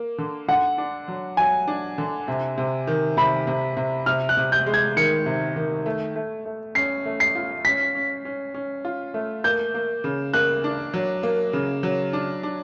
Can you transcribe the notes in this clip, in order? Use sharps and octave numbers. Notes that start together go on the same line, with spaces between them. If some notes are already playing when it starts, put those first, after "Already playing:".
Already playing: A#3
D3
D3 F#5
D4
F#3
F#3 G#5
D4
D3
C3
C3
D#3
C3 B5
C3
C3
C3 F6
F#6
C3
G6
G#3
G#6
D#3 C#7
C3
D#3
A3
A3
A3
C#4 C7
A3
C7
F4
C#4 B6
C#4
C#4
C#4
F4
A3
A#3 G6
A#3
C#3
A#3 F#6
D4
F#3
A#3
C#3
F#3
D4
D4